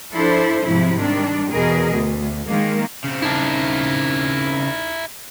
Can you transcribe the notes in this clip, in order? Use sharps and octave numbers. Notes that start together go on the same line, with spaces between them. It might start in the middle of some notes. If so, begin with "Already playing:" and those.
F3 D4 E4 A4 C5
G#2 C3 F3 F#3 E4
D#3 G3 D4
E2 B2 G#4 A#4 D#5
D2
D#3 G#3 A#3
C#3 C4
D#4 E4 A#4 A5